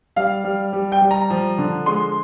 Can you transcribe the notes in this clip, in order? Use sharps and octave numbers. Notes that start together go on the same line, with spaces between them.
G3 F5
G3
G3
G5
G3
A#5
F3
D3
G#3 C6